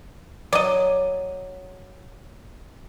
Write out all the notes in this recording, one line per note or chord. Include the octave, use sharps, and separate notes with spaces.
F#3 D5 D#5